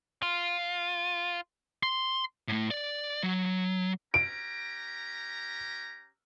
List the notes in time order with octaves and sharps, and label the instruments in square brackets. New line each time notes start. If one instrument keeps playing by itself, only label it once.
[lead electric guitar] F4
C6
A2 A3
D5
F#3
[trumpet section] C#4 G4 A#5 [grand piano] D7